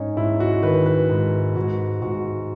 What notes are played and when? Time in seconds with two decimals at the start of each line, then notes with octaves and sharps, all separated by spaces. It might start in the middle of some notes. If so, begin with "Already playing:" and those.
Already playing: G#2 C#4 D#4
0.17 G#2 E4
0.40 F#4
0.63 D#3 B4
0.86 B4
1.10 G#2
1.56 G#2 F#4
2.02 G#2 F#4